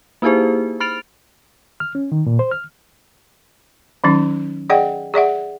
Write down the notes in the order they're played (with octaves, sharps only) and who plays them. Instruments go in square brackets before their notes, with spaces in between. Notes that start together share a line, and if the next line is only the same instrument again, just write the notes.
[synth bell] A#3 D#4 E4 G4 G#4 C5
B5 F6 A6 D7 F7
[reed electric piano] F6
C#4
D#3
A#2
C5
F6
[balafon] D#3 F#3 C#4 D#4
G#4 D5 D#5 F#5 G5
G#4 D5 E5 F#5